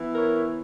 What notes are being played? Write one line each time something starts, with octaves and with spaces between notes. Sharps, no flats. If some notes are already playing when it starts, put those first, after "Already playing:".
Already playing: E3 B3 E4
A#4 C#5